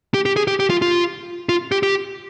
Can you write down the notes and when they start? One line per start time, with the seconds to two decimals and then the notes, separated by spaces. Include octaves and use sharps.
0.14 G4
0.26 G4
0.36 G#4
0.47 G4
0.60 G4
0.70 F4
0.82 F4
1.49 F4
1.72 G4
1.83 G4